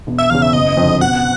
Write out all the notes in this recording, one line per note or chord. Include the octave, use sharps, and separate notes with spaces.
E1
E5
E2 C#3 F5
E5
F#1 D#5
F2 D3
B2 F#5